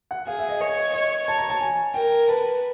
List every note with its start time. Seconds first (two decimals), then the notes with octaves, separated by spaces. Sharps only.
0.11 F#5
0.27 G#4 F5
0.39 E5
0.49 D#5
0.60 C#5 D#5
0.93 C#5 D#5
1.28 C#5 A5
1.38 A#5
1.50 A5
1.61 G#5
1.94 A#4 G5
2.28 B4 A5